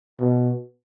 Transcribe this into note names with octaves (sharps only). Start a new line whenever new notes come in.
B2